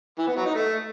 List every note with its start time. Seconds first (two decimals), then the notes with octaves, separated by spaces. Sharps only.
0.18 E3
0.28 B3
0.37 F#3
0.46 D#4
0.55 A3